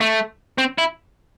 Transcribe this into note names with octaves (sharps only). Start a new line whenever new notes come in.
A3
C4
E4